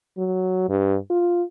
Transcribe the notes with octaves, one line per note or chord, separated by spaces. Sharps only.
F#3
G2
F4